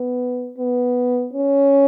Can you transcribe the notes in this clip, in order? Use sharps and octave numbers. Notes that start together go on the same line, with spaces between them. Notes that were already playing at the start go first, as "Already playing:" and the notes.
Already playing: B3
B3
C#4